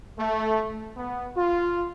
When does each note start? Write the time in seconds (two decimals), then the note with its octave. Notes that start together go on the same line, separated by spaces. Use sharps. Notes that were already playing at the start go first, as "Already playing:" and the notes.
0.19 A3
0.97 B3
1.36 F4